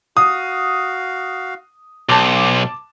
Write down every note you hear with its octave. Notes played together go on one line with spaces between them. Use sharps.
F#4 F5 D#6
B1 A5 C6 D6